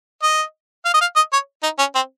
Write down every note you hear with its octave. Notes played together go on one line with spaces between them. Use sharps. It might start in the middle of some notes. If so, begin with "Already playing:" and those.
D#5
F5
D#5
F5
D#5
C#5
D#4
C#4
C4